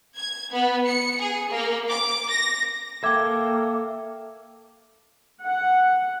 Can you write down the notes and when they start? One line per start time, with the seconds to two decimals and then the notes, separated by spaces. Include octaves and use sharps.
0.17 G#6
0.52 B3
0.86 C#7
1.20 G#4
1.50 A#3
1.89 D6
2.30 A#6
3.04 A#3 A4 E5 G5 D6 G#6
5.44 F#5